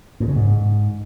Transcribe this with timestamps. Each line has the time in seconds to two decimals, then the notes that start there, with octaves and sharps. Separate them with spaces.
0.20 A2
0.28 C#3
0.36 G#2